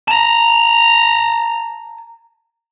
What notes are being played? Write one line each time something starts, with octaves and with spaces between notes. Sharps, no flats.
A5 A#5